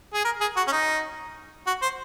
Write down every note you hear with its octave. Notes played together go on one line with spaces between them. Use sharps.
G#4
A#4
G#4
F#4
C#4
D#4
F#4
C5